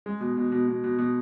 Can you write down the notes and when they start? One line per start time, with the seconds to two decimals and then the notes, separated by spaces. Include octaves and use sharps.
0.06 G#3
0.20 B2
0.37 B2
0.52 B2
0.67 B2
0.84 B2
0.98 B2